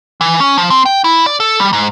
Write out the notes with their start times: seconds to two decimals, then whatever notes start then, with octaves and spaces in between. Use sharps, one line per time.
0.21 E3
0.40 C#4
0.58 F3
0.70 C4
0.86 G5
1.04 E4
1.26 D5
1.40 A4
1.60 G3
1.73 G#2